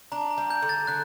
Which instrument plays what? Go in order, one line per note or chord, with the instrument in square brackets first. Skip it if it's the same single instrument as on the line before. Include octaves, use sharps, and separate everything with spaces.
[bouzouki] D4 [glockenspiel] A#5
[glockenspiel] A#5
[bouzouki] G3
[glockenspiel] G6
[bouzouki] D3
[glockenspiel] A6
[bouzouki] D3 [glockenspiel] F#6